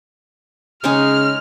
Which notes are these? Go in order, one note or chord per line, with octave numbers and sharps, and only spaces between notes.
C#3 G#3 C#4 D#4 F6